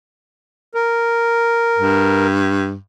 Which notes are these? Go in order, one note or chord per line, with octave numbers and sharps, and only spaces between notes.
A#4
G2